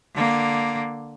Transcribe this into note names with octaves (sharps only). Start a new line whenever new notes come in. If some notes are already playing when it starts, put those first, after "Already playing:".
D3 A#3